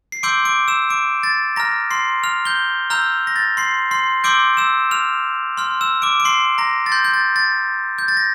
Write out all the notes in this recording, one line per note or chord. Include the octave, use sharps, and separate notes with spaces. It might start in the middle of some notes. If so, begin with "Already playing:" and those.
C7
C6 D6 E6 G6 D7
D6 D7
E6 E7
D6 D7
A6
A#5 F6 A#6
C6 C7
F6 F7
G6 G7
A#5 E6 F6 G6 F7
A#6
A6
C6 C7
C6 C7
C6 D6 E6 G6 D7
E6 E7
F6 F7
C6 F6
E6 E7
D6 D7
D7
C6 C7
A#5 A#6
A6
C6 G6
G6
A6
A6
G6
A6
A#6